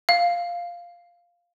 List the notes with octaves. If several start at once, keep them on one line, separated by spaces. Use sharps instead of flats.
F5